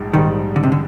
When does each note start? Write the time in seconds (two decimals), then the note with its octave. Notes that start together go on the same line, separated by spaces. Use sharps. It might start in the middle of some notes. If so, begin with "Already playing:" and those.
Already playing: A#1 G#2 G3
0.13 A#1 G#2 D#3 G3
0.56 D3
0.63 C3
0.72 D3